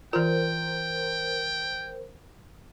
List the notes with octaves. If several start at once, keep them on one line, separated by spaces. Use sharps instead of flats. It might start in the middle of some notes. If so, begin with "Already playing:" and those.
E3 F4 A#4 C5 G5